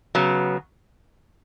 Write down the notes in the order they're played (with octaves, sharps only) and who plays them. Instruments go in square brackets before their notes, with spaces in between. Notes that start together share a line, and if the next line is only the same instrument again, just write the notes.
[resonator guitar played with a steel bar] C#3 F#3 B3